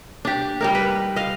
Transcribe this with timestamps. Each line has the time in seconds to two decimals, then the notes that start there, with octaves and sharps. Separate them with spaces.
0.25 D4 G4
0.61 G3 D#4 A#4
0.75 B4
1.16 D#5 F5